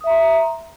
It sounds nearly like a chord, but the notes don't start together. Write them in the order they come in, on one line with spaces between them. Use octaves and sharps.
D#6 E5 A#5 C6